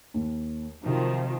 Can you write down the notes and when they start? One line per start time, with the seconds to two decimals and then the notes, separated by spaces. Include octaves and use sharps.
0.14 D#2
0.85 C3 D#3 F3 F#3